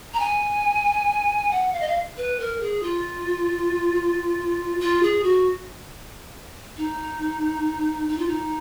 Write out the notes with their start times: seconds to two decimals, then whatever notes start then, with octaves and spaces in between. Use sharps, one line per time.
0.14 A#5
0.20 G#5
1.51 F#5
1.73 F5
1.80 D#5
1.88 F5
2.17 B4
2.40 A#4
2.61 G#4
2.83 F4
4.80 F4
5.03 G#4
5.24 F#4
6.77 D#4
8.09 D#4
8.18 F4
8.28 D#4